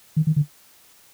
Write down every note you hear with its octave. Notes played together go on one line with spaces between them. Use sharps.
D#3
D#3
D3